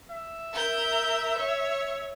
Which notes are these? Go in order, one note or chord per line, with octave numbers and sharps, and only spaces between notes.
E5
A#4 G6
C#5